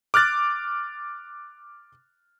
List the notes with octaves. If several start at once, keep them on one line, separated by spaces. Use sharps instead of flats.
D6 F6 F#6 A6